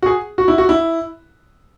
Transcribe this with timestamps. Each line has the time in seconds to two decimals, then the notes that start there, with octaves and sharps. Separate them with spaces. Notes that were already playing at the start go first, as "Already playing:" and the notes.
0.02 F#4
0.06 G#4
0.38 F#4
0.48 E4
0.58 F#4
0.69 E4